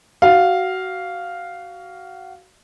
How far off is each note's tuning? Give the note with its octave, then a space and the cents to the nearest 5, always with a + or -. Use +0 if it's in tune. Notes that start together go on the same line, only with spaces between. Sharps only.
F#4 +20 F5 +0